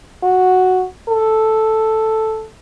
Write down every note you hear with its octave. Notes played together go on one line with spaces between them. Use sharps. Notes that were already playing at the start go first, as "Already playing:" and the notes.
F#4
A4